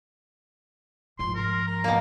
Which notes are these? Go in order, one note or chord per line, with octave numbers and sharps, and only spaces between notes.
G#2 F3 C6
A#4
A#5
B2 A#3